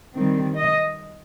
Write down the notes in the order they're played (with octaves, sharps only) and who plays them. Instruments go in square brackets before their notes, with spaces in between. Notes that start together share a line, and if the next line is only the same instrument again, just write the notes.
[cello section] D#3 G3 C4
D#5